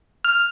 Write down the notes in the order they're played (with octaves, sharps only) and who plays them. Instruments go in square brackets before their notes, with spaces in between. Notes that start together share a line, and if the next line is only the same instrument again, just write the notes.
[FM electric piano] F6